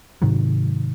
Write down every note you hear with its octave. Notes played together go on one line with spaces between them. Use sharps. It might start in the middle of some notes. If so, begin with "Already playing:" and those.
G#2 C3 D#3 F#3